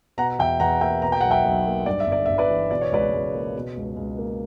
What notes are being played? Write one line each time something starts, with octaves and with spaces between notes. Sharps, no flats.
B2 F#5 A#5
E2 E5 G5
E2 F#5 A#5
A#3 E5 G5
B2 A#5
G5
B1 F#5
E5 G5
B1
A#3
G2 D5
E5
G1 D5
G1 E5
B4 D5
E3
B2 D5
C#5
C#2 B4 D5
C#2
A#3
B2
C#2
C#2
A#3